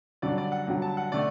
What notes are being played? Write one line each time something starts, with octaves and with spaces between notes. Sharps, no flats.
G2 D3 F#3 D5
D5
F#5
G2 D3 F#3
A5
F#5
D3 A3 D5